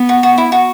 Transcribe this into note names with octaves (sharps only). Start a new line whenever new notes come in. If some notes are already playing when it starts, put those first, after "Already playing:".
Already playing: B3
F#4
F#4
E4
F#4